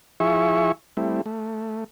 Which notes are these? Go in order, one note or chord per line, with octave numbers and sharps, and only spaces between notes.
F3 E4 G#4 E5 C#6
G3 A3 C4 E4
A3